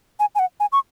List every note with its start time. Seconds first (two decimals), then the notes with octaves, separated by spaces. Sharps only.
0.20 G#5
0.35 G#5
0.39 F#5
0.60 G#5
0.72 C#6